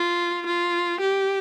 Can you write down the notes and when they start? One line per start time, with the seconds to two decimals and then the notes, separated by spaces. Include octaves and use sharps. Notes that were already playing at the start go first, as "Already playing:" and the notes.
Already playing: F4
0.46 F4
1.00 G4